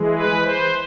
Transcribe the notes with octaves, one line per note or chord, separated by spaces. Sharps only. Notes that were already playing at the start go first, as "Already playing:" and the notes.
Already playing: E3 G#3
B4
C5